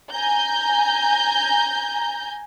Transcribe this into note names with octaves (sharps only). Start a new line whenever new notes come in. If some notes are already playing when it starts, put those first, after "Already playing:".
G#5 A#5 G6